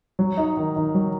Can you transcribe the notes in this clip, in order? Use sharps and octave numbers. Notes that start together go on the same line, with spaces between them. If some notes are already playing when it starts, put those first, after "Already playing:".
F#3
D#4
D#3
D#3
F#3